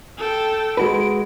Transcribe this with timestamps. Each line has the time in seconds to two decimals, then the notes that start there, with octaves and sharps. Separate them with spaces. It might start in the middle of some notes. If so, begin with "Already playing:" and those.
0.18 A4 G5
0.77 G#3 F#4 B4 D7